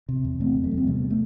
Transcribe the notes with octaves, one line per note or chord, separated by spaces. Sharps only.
C3
E2
C3 A3 C4
E2
F#3 A3
E2
C4
C3 G3 B3
A3